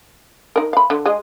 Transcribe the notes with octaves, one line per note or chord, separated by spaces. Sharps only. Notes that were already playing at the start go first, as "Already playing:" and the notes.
D#4 A#4
F5 B5
D3
G#3 G#4 D#5